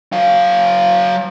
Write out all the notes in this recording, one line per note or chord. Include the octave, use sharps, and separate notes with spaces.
F#3 F5